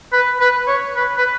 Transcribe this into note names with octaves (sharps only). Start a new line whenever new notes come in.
B4
B4
C#5
B4
B4